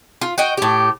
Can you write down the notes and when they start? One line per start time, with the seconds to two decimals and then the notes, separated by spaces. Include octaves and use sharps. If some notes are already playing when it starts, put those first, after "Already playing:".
0.21 F4
0.38 F#4 D#5 G5
0.57 A2 G4